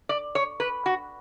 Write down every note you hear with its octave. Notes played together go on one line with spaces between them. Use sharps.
D5
C#5
B4
F#4